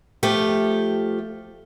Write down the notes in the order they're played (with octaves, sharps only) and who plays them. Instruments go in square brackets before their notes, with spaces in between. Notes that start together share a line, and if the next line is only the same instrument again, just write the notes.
[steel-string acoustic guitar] F3 A3 G4